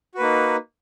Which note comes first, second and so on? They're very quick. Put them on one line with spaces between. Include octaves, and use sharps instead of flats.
F#4 B4 A#3 D#4